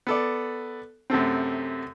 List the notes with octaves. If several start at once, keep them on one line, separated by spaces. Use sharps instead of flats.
B3 A4 D5
F#2 C3 A3 C4